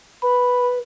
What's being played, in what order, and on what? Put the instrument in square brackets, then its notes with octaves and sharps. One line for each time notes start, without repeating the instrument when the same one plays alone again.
[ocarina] B4 [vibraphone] B5